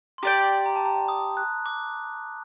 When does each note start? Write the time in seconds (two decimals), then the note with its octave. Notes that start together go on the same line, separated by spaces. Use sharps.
0.18 C6
0.23 G4 D5 G5 A#5
0.66 A#5
0.76 A5
0.85 A#5
1.08 D#6
1.37 F#6
1.66 D6